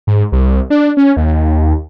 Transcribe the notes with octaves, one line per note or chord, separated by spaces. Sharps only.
G#2
C2
D4
C#4
D#2